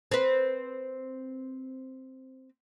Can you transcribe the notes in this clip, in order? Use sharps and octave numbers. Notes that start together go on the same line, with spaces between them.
C4 B4